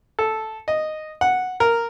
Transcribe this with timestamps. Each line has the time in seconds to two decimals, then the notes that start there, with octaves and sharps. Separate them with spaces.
0.19 A4
0.68 D#5
1.21 F#5
1.60 A#4